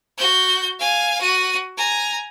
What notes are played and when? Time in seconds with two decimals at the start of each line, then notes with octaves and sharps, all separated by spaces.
0.18 F#4 G6
0.79 F5 G#5
1.21 F#4 D#7
1.77 G#5 A#5